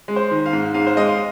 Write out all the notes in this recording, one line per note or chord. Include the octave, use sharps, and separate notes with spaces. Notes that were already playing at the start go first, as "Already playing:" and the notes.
G#3
C5
D#3
F5
G#2
G#2 F5
C5
G#3 D#5
F5